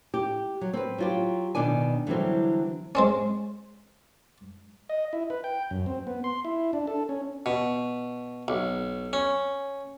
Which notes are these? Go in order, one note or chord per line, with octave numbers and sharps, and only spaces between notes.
G4
F#3
C4 B4
F#3 F4 G4
B2 D#3 D4 D5 G#5
D3 E3 F#3 G3 C4
G#3 C4 C#4
D#5
E4
B4
G5
F#2
C4
B3
C6
E4
D4
A4
C#4
B2
B1
C#4